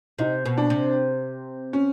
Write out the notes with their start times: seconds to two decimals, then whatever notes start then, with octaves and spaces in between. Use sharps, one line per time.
0.19 C3 D#4
0.45 B2
0.57 D4
0.70 C3
1.73 C#4